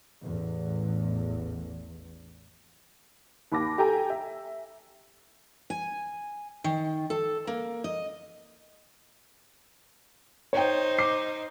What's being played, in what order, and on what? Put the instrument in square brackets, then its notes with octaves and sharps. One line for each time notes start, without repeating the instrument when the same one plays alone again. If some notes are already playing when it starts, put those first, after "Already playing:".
[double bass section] A1 E2
[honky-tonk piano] D#2 B5 D6 A#6
G4 A4 G5 G#5 A#5
E5
[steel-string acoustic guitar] G#5
D#3
A4
A#3
D#5
[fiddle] D#4 C5 [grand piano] C#5 G5
[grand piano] D6 C7